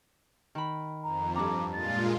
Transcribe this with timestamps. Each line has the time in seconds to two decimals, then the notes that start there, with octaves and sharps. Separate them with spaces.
0.55 D#3 B5
1.04 F2 A#5
1.35 G2 D4 A#5 D6
1.73 A#2 G#3 F4 A6